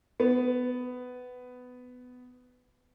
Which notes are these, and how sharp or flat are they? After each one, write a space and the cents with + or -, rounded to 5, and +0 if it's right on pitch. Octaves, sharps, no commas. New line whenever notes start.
B3 +15